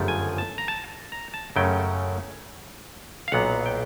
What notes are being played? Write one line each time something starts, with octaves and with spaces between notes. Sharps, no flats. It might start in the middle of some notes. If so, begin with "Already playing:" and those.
Already playing: G1 F#2 C#3 F3 A3
G#5
A5
A#5
A5
A#5
A5
F#2 C#3 F#3 A3 C#4 G5
F5
B1 A#2 F#3 B3 F#5
G5